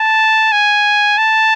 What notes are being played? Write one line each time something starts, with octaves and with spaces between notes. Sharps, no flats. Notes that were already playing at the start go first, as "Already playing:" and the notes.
Already playing: A5
G#5
A5